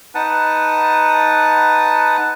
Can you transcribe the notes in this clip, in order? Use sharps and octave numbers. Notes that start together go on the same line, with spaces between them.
D#4 B4 F#5 A5